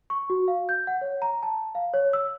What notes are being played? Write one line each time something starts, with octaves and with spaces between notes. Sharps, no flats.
C#6
F#4
F5
G6
F#5
C#5
A#5
A5
F5
C#5
E6